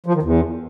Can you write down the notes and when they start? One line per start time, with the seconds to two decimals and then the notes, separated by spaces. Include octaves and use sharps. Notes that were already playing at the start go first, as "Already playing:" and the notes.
0.06 F3
0.14 D#3
0.23 E2